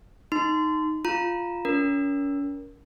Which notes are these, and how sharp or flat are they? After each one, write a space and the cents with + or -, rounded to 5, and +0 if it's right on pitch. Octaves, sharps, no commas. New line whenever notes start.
D#4 +0 C6 -25
F4 +0 A#5 +0
C#4 +35 A#4 +15